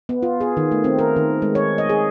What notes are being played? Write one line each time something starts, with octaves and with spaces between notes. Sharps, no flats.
B3
F4
G#4
D#3
A3
C4
A#4
D#3
G#3
C#5
D#5
G#4